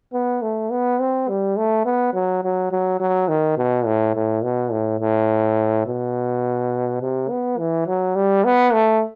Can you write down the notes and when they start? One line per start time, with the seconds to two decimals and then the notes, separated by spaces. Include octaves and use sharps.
0.14 B3
0.42 A3
0.71 B3
1.00 C4
1.29 G3
1.57 A3
1.85 B3
2.14 F#3
2.43 F#3
2.72 F#3
3.00 F#3
3.29 D#3
3.58 B2
3.86 A2
4.15 A2
4.43 B2
4.72 A2
5.00 A2
5.87 B2
7.01 C3
7.30 B3
7.58 E3
7.87 F#3
8.16 G3
8.45 B3
8.73 A3